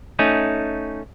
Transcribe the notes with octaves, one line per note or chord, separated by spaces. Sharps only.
A3 C#4 D#4